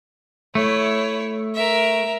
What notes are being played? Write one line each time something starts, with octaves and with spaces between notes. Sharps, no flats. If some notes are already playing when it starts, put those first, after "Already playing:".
A3 E4 C#5
A#4 E5